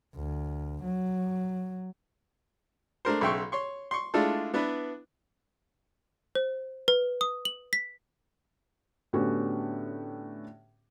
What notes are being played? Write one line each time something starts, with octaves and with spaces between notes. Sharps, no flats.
D2
F#3
A3 D4 A#4 C5
B1 C#3 E5 G5 C6 C#6
C#5 C6 C#6
C6 C#6
G#3 A3 D4 E4 F4 A4
B3 D4 E4 B4
C5
B4
D#6
F#7
B6
A2 D3 B3 C#4 F#4 G4